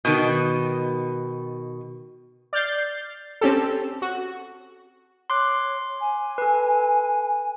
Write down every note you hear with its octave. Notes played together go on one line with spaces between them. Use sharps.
B2 D#3
D5 F6 G6 A6 C7
C4 C#4 G4 A4
F#4
C#5 C6 D6 F#6
G#5
A4 B4